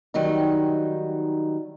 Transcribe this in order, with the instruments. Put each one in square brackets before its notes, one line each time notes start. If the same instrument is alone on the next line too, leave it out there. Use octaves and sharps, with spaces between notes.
[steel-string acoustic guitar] D#3 F#3 G3 D#4